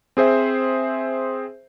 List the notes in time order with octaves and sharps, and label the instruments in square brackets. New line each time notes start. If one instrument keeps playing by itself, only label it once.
[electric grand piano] C4 G#4 C5 E5